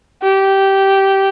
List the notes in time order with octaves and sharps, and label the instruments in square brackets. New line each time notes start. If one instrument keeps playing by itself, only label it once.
[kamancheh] G4